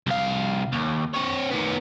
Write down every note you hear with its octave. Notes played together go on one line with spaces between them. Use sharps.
C2 F5
D#2
C4 C#5
D#3 B3